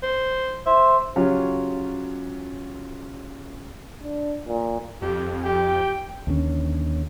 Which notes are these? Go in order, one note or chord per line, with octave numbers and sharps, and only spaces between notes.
C5
C5 E5
C#3 F#3 C#4 F4 G4
D4
A#2
F2 G4
G4 G5
D#2 D3 C#4